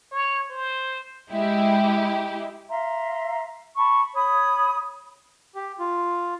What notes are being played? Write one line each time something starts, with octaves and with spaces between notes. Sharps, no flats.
C#5
C5
G#3 E4 G4
E5 F5 A#5 C6
A5 B5 C#6
C#5 B5 D#6
G4
F4